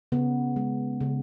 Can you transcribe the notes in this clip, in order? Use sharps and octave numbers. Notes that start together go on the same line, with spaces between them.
C#3 B3
G#3
C#3